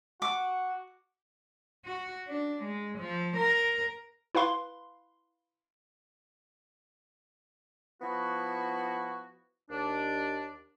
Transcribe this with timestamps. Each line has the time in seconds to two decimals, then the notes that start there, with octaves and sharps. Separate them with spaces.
0.22 F#4 D6
1.85 F#4
2.28 D4
2.63 G#3
2.98 F3
3.37 A#4
4.35 E4 B4 F5 C6
8.02 F3 B3 E4 F#4
9.70 D#2 D4